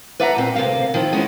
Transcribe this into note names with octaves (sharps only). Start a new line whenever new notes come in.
B4 D5 E5 F#5 G5 A#5
A#2 C4
D2 C3 F3 A#3 F5
D#3 F3 E4
G#3 B3 C#4 E4